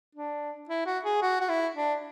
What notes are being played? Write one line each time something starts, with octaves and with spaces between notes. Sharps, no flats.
D4
E4
F#4
G#4
F#4
F#4
E4
D4